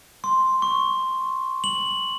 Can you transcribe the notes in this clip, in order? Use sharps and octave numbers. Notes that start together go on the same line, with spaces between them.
C6
C#6
F#7